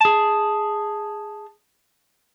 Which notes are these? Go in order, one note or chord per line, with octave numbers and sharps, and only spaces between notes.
G#4 A5